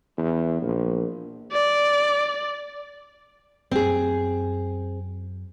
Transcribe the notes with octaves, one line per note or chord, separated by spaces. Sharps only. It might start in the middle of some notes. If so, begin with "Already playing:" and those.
E2
A#1
D5
F#2 C4 G#4